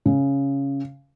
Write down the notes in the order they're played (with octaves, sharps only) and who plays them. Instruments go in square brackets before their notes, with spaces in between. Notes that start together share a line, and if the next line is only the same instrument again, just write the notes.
[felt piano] C#3